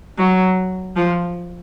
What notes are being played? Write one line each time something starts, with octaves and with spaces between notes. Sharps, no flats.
F#3
F3